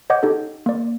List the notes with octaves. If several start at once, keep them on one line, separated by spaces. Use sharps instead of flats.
C#5 D#5 F#5 D6 G6
D#4 G4 A4
A#3 D5